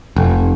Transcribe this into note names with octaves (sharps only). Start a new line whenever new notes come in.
F1